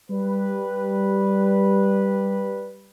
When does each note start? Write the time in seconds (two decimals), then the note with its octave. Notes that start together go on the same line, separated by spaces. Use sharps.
0.11 G3 B4